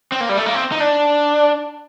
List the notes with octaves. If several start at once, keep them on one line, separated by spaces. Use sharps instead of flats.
C4
A#3
G3
A3
A#3
C4
D#4
D4